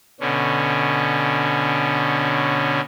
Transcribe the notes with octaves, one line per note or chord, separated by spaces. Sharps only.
B2 D3 C#4